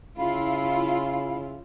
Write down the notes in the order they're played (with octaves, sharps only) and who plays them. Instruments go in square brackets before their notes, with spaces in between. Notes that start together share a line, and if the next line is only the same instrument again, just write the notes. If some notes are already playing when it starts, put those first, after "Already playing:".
[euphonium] C#3 [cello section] E4 F4 [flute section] F5 B5